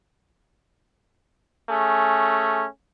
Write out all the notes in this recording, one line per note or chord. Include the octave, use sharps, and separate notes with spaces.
A3 C#4 G#4